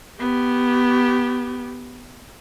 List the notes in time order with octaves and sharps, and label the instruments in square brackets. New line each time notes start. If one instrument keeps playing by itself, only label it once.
[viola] B3 G4